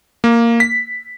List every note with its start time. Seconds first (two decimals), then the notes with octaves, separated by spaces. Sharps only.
0.24 A#3
0.60 B6